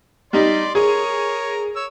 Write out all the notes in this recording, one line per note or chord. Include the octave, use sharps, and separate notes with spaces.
G3 D#4 D5 C6
G#4 A#4 C#5
C#5 E6